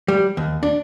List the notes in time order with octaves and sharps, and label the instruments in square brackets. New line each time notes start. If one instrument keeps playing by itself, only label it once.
[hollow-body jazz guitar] G3
D#2
D4